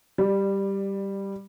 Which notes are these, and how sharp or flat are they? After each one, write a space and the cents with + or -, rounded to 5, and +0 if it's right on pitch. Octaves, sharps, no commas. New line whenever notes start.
G3 +0 D5 +20